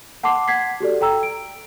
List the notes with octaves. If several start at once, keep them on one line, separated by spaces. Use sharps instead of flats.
F#5 A5 C6 D6 C7
F#5 G#6 B6 C7
F#4 G4 A4 D5
A4 G5 A#5 E6
D7